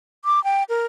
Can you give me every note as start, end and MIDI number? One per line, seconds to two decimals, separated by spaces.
0.25 0.43 86
0.44 0.63 79
0.69 0.86 70